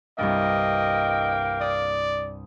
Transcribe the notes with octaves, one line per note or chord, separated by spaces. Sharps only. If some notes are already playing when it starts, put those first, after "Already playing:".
C2 G2 A#3 D4 D#5 G5
D5 D#6